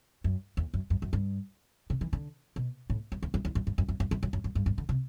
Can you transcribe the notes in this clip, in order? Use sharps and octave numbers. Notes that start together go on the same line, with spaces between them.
F#2
E2
F#2
F#2
F#2
G2
C3
E3
D3
B2
A2
F#2
E2
F#2
E2
F#2
G2
F#2
F#2
F#2
F#2
F#2
F#2
F#2
G2
G2
D3
C3